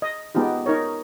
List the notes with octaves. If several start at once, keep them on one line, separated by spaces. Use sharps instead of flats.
D#5
G#3 B3 D#4 F4 G4
D#4 A#4 C#5